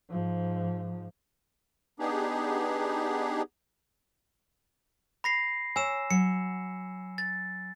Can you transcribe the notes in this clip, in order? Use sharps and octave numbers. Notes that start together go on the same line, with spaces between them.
G#2 F3
B3 D4 D#4 G4 G#4
B5 A#6 C7
C#5 G#5 E6 E7
F#3 C#7
A6